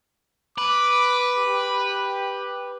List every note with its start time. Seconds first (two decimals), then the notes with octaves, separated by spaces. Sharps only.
0.58 B4 D6
1.38 G4